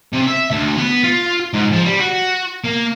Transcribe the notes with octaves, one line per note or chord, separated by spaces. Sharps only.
C3
E5
D2
B3
F4
G#2
F3
G3
F#4
A#3